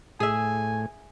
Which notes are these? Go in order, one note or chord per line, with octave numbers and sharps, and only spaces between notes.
A2 G#4 E5 G#5